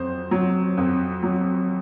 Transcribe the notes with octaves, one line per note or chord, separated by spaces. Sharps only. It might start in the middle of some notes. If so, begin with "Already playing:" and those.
Already playing: F2 F#3 C5
F#3
F2
F#3